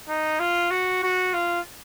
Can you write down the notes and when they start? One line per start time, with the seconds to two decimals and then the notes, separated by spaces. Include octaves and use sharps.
0.09 D#4
0.40 F4
0.70 F#4
1.03 F#4
1.33 F4